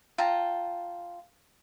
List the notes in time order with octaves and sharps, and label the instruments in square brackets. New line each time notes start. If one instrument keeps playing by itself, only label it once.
[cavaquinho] F4 G5 A5 A#5